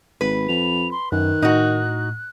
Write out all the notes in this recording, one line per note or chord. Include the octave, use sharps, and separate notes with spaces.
G#1 B4
F2 F7
C6
F#2 D#3 F#6
A2 D#4 F#4